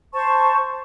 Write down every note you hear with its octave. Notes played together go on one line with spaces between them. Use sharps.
C5 A5 C#6